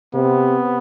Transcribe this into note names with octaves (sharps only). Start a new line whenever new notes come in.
C3 B3